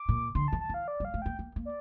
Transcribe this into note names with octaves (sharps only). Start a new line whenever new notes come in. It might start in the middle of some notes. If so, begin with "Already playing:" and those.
Already playing: D6
A#2
D3 C6
A5
E3
A5
E3 F5
D5
G3
F5
A3
A#3 G5
A#3
A#3
D5